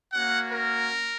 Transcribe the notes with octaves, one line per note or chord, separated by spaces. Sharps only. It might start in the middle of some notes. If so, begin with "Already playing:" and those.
A#3 C#4 F#4 F#5
A#4